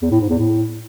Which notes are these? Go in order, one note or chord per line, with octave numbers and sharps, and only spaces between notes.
E2
A2
G#2
E2
A2